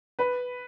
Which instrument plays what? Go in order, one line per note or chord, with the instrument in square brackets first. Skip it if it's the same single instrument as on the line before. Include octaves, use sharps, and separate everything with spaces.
[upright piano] B4